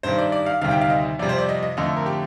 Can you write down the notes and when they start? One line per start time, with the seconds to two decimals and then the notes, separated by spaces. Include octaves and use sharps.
0.03 G2 D#3 G3 C5
0.18 D5
0.32 D5
0.46 F5
0.61 D2 C3 D#3 G3 F5
0.71 G5
0.81 F5
0.90 D#5
1.19 F2 C3 G3 D5
1.29 C5
1.38 D5
1.49 D#5
1.63 D#5
1.77 F2 D3 A3 D#5
1.97 A#4
2.06 G4